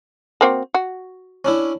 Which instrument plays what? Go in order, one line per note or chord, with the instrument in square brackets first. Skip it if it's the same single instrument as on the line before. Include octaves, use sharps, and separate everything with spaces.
[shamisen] A#3 C4 F#4
F#4
[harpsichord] C#4 D4 E4